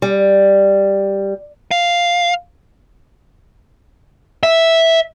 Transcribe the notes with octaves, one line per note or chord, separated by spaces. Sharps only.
G3
F5
E5